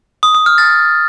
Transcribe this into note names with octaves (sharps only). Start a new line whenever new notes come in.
D#6
D#6
F6
A6